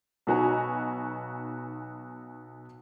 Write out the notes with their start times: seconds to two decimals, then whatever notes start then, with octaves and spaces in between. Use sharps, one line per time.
0.27 B1 D#4 F#4 B4 G#5 A#5